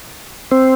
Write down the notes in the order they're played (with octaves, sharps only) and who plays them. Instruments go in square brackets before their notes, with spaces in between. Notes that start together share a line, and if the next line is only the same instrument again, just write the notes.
[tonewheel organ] C4